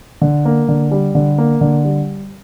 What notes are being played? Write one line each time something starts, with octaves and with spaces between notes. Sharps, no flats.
D3
A#3
D3
G3
D3
A#3
D3
G3